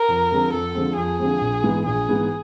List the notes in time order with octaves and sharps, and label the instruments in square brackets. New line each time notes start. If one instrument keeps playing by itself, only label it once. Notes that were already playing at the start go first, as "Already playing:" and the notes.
Already playing: [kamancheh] A#4
[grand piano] F2
D3 F3 G#3 C4
[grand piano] F2 [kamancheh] A4
[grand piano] D3 F3 G#3 C4
[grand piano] F2 [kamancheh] G#4
[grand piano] D3 F3 G#3 C4
A#1
G#2 E3 G#3 B3
[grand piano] A#1 [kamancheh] G#4
[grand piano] G#2 E3 G#3 B3